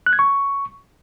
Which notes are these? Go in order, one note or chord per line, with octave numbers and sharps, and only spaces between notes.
F#6
G#6
C#6